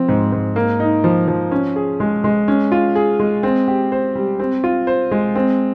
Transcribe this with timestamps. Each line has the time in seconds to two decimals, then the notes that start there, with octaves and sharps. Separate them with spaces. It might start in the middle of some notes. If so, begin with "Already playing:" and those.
Already playing: F3 C4
0.09 G#2
0.32 G#2
0.56 A#3
0.80 D#4
1.04 F3
1.28 F3
1.52 C#4
1.76 G#4
2.00 G#3
2.24 G#3
2.48 C#4
2.72 F4
2.95 G#4
3.20 G#3
3.43 C4
3.68 G4
3.92 C5
4.15 G3
4.39 C4
4.64 F4
4.87 C5
5.11 G#3
5.35 C4